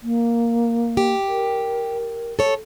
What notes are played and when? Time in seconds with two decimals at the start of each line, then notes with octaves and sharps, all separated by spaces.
0.03 A#3
0.97 G4
1.28 A#4
2.39 A4 C#5